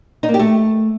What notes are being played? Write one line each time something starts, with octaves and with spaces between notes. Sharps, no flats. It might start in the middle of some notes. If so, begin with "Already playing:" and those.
D#4
A#3
G4
A3